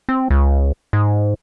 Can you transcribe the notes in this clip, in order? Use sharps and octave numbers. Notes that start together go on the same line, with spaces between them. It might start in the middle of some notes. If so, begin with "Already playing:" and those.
C4
C#2
G#2